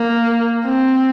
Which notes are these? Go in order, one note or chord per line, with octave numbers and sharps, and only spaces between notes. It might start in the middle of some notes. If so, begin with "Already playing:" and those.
Already playing: A#3
C4